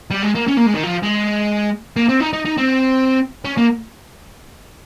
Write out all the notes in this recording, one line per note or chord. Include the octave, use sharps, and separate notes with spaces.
G3
G#3
A#3
C#4
A#3
G#3
D#3
F3
G#3
A#3
C4
D#4
D#4
D#4
C4
C#4
A#3